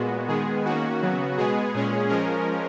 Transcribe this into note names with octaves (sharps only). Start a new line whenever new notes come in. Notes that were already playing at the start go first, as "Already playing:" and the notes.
Already playing: A#2 G#3 B3 F#4
D#3 G#3 B3 G#4
D#3 A#3 C#4 F#4
C#3 F#3 B3
B2 G#3 B3 G#4
A#2 G#3 C#4
F3 G#3 C#4 A#4